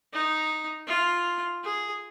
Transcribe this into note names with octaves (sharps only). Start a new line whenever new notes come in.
D#4
F4
G#4